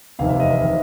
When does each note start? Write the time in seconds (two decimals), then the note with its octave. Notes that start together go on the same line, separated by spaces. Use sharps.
0.19 F1 E2 C3 D#3 F5
0.29 E5
0.40 D#5
0.51 E5
0.61 C3 D#3